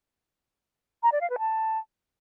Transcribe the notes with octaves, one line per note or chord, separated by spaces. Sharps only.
A#5
D5
F5
B4
A5